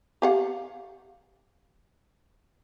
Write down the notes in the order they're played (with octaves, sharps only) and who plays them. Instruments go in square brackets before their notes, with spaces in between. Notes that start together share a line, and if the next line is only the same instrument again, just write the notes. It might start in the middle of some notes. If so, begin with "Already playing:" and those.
[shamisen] G4 F5 F#5